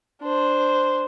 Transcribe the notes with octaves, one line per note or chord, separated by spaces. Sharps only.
D4 C5